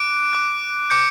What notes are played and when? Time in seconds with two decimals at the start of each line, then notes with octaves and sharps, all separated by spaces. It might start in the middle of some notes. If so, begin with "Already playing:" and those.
Already playing: D6 F#6 D7
0.33 D6 F#6
0.90 D6 G6 C#7